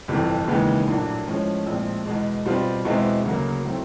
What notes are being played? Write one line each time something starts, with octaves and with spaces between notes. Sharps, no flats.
G1 F2 C3 E3
D#2 C#3 E3 G#3 B3
A#1 A2 F#3 A#3 D4
A2 F3 G#3 C#4
A#1 A2 F3 G#3 C4
E2 B2 G#3
B2 G3 C4 F4
E2 B2 G#3 C4 E4
D2 C#3 F#3 A#3
A2 F#3 A3 C4